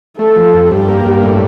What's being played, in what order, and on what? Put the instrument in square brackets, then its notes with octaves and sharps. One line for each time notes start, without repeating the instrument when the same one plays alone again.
[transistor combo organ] A3 [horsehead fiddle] A4
[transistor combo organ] F3
F2
[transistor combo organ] G2 [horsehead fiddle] G4
[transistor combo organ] A#3
G2
A2